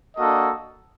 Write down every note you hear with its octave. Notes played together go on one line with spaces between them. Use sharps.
A#3 D4 F#4 A4 D#5